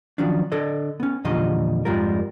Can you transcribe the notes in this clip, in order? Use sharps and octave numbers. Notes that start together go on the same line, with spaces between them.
D#3 F3 F#3 C#4 D4
D3 A4 D5 D#5
B3 C#4
E2 A#2 D3 F3 G3 D#5
F2 G#2 G3 G#3 F4 A#4